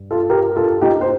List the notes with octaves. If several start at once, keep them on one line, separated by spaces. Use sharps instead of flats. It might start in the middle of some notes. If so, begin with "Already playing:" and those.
Already playing: G2
F4 A4
G4 A#4
F4 A4
D#4 G4
C5